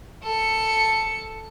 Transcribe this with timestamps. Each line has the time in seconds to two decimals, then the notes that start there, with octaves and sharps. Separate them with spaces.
0.23 A4 C#7